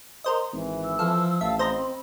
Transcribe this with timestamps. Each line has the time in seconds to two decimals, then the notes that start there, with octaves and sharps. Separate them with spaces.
0.24 A#4 C5 D#5
0.53 G#1 E3
0.84 E6
0.99 F3 A4 F5
1.41 A1 E5 F5 A5
1.59 C4 C5 D#5 A#5 B5